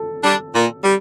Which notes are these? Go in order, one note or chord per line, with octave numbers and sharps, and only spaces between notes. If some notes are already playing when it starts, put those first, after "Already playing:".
Already playing: A4
G3 D4
A#2
G3